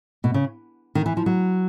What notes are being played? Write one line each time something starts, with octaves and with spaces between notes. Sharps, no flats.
B2
C#3
D#3
E3
F3
F#3